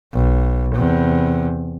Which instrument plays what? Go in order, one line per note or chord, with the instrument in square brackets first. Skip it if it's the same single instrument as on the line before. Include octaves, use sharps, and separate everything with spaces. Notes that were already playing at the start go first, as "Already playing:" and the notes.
[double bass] B1
E2 C3